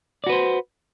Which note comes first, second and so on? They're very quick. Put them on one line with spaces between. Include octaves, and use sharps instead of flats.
D5 F#4 B4 C5